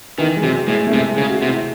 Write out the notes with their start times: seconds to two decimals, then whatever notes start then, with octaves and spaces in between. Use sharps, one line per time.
0.18 D#3 E3
0.37 G#3
0.43 C3 F#3
0.68 A2 G#3
0.87 A3
0.92 C3 G#3
1.11 G#3
1.18 C#3
1.30 F#4
1.42 C3
1.49 E4